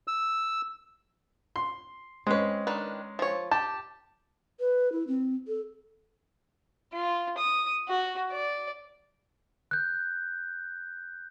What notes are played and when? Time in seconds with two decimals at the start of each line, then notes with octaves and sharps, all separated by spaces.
0.08 E6
1.56 C6
2.27 G#3 C4 C#4 B4
2.67 D#3 D4 B4
3.19 F3 C#5
3.51 G4 A5
4.60 B4
4.92 E4
5.07 C4
5.48 A4
6.93 F4
7.38 D#6
7.89 F#4
8.32 D5
9.71 F#6 G6